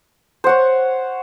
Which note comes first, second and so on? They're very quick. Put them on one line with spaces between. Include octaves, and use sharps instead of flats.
C5 F#5 C#5